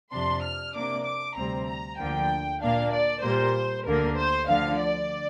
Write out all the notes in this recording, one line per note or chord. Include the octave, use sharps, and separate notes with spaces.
F2 C3 F3 D4 C6
F6
C3 A#3 D4 D6
D6
D2 C3 G3 C4 A#5
A#5
D2 D3 F3 A#3 G5
A#2 A#3 D4 F5
D5
A#2 G3 A#3 C5
D2 D3 A#3 A#4
C5
D2 D3 F3 F5
D5